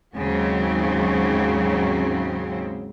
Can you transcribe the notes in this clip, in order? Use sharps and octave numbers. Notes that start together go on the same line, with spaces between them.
D#2 G#2 C#3 F#3 C4